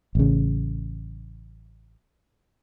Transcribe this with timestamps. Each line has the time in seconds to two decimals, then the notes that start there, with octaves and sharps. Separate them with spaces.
0.15 A1 C#3